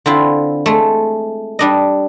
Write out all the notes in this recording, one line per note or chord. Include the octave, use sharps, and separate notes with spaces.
D3 C4 E4 F4
G#3 A3
G3 D4 D#5